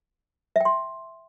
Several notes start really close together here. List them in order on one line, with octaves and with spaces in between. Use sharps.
E5 G5 C6